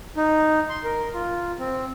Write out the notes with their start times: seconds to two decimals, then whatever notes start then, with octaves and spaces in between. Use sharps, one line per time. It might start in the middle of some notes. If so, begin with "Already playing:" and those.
0.16 D#4
0.69 C6
0.84 A#4
1.14 F4
1.59 C4